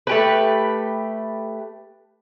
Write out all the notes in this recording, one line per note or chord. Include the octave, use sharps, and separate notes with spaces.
A3 G4 B4